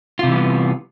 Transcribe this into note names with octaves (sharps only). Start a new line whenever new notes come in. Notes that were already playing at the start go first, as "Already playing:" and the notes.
C3 E3 G3 B3 F4